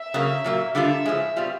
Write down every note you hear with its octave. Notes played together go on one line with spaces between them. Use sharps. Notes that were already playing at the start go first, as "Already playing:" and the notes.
Already playing: E5
C#3 F#3 A#3
A#2 F#3 A#3
D3 G3 A#3 D4 F4 E5
A2 F3 G#3
B2 G3 C4 F4